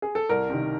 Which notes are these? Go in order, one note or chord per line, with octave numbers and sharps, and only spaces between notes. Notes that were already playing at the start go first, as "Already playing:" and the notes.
G#4
A4
C2 A#4
C3 D#3